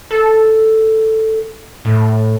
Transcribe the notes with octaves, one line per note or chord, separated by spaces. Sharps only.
A4
A2